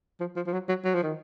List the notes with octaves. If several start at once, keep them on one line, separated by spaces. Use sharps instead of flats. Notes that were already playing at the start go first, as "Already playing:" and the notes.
F3
F3
F3
F#3
F#3
F#3
F3
D#3